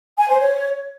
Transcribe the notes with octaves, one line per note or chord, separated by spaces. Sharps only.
G#5
C5
C#5